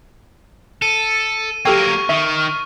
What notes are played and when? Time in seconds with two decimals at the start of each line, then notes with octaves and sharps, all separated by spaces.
0.82 A4 D#7
1.65 F#3 A#3 G4 A4 G5 C#6 F6
2.09 D#3 E5